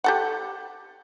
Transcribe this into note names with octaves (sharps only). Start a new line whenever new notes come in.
G4 A4 F#5